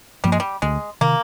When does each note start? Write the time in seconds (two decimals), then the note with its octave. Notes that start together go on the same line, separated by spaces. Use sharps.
0.24 G2 F3 G3 A#3
0.32 G#3
0.40 G3
0.62 D2 G#3
1.01 C3 D#3 A#3